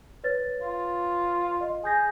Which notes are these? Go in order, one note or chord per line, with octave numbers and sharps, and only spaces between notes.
B4 C#5 A6
F4
D#5
G#4 G#5 G6 A#6